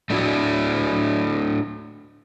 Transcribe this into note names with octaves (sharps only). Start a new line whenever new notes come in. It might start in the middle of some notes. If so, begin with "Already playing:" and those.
A3 D4 E4 F#4